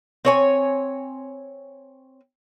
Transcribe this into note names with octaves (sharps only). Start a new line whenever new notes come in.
C4 C#5 G#5